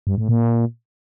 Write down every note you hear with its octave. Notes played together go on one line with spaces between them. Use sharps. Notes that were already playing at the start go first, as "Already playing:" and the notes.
G2
A2
A#2